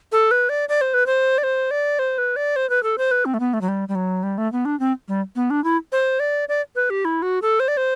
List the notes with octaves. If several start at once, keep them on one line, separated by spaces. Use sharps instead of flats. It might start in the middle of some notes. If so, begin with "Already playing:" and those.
A4
B4
D5
D5
C5
B4
C5
D5
C5
D5
C5
B4
D5
C5
B4
A4
C5
B4
C4
A3
B3
A3
F#3
G3
G3
F#3
G3
A3
B3
D4
C4
G3
B3
D4
E4
C5
D5
D5
B4
G4
E4
F#4
A4
C5
D5
C5